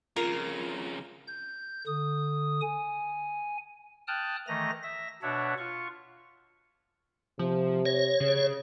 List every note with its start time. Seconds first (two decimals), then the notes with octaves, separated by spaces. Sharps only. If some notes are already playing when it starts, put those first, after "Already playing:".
0.16 F2 C#3 F4 A#4 A#5
1.27 G6
1.87 D3 D#6
2.62 G#5
4.08 G5 A5 D#6 F6 F#6
4.48 D#3 E3 A3 D#5 A#5 A#6
4.83 E5 A#6
5.22 B2 D4 C#5 E5 F#5
5.58 F4 C#6
7.39 C3 F3
7.86 C#5 A#6
8.20 C#3